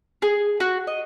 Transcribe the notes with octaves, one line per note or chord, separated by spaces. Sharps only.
G#4
F#4
D#5